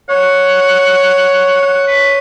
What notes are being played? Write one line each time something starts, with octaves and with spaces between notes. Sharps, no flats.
C#5 F#5
F#5
B4